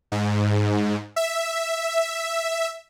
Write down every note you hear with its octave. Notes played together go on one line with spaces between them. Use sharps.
G#2
E5